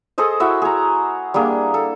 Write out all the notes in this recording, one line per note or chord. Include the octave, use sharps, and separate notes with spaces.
G#4 A4 C5 D#5
E4 F#4 E5
G#4 A#5
G3 A#3 D4 G#4
A4